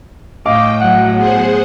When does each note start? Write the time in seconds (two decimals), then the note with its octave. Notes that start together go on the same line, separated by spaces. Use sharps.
0.46 A2 D#5 F5 G5 D6
0.80 F#3 F#5
1.17 B3 G#4 C5 F#5